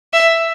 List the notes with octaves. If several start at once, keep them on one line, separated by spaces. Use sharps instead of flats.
E5